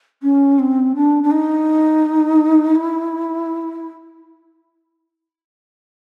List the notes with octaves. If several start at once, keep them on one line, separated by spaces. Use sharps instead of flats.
C#4
C4
D4
D4
D#4
E4